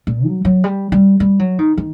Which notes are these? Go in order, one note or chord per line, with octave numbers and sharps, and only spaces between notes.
A#2
F#3
F#3
G3
G3
G3
F#3
D#3
D#3